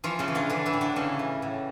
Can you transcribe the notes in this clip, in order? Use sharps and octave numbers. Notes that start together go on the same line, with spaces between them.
E3 F3 F4
C#3 C#4
E3
D3 D4
D3 E3 D4
E3 E4
A2
D3 D4
C#3 E3 C#4
E3
A2